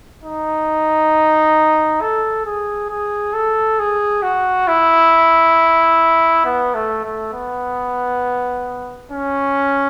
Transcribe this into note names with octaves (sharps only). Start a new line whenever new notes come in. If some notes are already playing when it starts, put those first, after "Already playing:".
D#4
A4
G#4
G#4
A4
G#4
F#4
E4
B3
A3
A3
B3
C#4